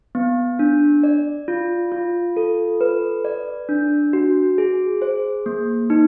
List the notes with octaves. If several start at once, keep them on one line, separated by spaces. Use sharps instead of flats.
B3
D4
D5
F4
F4
A4
B4
D5
D4
F#4
G#4
C5
A#3
D#4